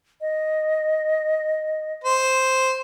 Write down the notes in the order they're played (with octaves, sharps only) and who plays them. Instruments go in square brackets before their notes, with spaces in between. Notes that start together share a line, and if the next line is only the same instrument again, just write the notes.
[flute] D#5
[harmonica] C5